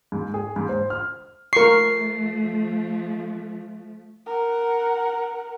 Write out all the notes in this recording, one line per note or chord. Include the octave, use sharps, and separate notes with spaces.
G#2
G#4
G#2
C5
F6
F3 A3 A#4 C#6 C7
A#4 F#5